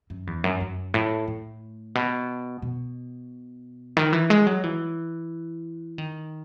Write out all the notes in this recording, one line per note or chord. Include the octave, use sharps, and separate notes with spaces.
F#2
E2
F#2
F#2
A2
A2
B2
B2
D#3
E3
G#3
F#3
E3
D#3